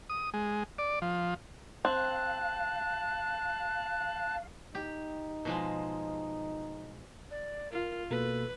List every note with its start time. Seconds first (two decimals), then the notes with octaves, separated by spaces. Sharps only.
0.10 D#6
0.34 G#3
0.78 D5
1.02 F3
1.85 C4 F5 A5 F#6
4.75 D#4 G4
5.45 B2 F3 G#3
7.31 D5
7.72 F4 A#4
8.11 B2 A#3 A4 B4